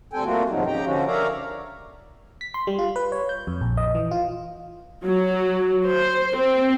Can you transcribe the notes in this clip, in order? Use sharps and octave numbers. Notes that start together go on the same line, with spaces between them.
D2 G3 C4 A4 G5 G#5
G3 A3 A#3 C4 F4 F#4
E2 G#2 C3 F3 F#3 D#4
C#3 D#4 G4 G5 A#5
D3 F3 C#4 F#4
A#4 C#5 D5 E5 F5 A#5
B6
C6
G3
F4
B4
C#5
G6
F2
A#1
D#5
E3
F4
F#3
C5
C4